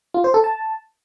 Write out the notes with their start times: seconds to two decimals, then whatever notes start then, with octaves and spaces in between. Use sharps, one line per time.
0.14 F4
0.24 C5
0.34 A4
0.44 A5